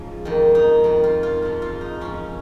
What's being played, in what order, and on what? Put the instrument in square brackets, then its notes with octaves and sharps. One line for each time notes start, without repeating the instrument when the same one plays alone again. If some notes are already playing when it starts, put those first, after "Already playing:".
Already playing: [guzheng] G#2 F3 C#4 D#4
F2 D#3
D#4
F2 D#3
F4
F4
G#2 F3
F4
D#4
G#2 F3 C#4